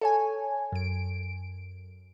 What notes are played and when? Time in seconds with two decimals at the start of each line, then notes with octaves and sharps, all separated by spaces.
0.01 A4 C#5 G#5
0.72 F#2 D7